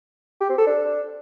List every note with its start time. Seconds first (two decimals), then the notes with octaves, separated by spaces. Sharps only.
0.41 G4
0.49 C4
0.58 A4
0.67 D4